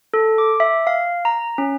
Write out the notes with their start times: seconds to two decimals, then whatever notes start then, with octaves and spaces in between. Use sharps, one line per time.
0.14 A4
0.38 D6
0.60 E5
0.87 F5
1.25 A#5
1.58 C#4